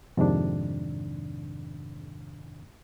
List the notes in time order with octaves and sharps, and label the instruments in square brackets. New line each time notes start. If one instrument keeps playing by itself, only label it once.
[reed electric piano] F2 G#2 C3 D#3 D4